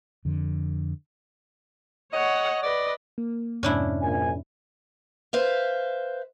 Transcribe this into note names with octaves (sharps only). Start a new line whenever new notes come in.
F2 D3
C#5 D#5 F#5
B4 D5 D#5
A#3
F2 G#2 C3 C#4 D4 E4
A#1 G#5
B4 C5 E5 F5